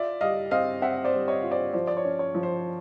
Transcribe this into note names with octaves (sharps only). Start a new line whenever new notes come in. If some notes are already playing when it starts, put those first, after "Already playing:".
Already playing: F4 D5 E5
G3 D#5 F5
C4 D#5 F5
C4 E5 F#5
C5 D5
G3
C#5 D#5
F4
C5 D5
F3 C5 D5
D5
C#5
C#4
C#5
F3
C5